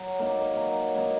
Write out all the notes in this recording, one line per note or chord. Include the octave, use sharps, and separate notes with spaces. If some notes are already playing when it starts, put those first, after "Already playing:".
Already playing: F#3
A#3 D#4
F#3
A#3 D#4